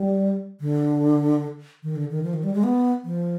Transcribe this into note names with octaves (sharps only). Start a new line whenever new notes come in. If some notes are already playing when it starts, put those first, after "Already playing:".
Already playing: G3
D3
D#3
D3
D#3
F3
D#3
G3
G#3
B3
F3